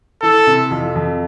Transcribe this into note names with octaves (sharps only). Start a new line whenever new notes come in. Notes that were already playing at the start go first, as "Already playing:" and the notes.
E3 A4
C3
F2
F2